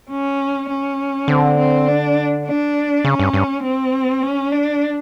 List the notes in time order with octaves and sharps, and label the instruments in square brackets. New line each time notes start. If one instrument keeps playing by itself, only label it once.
[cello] C#4
C#4
[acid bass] D3 [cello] C4
[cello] C4
D4
D4
[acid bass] C#3 [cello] C#4
[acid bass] G2
G2
[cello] C4
C#4
D4